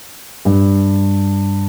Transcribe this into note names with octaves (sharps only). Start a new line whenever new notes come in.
G2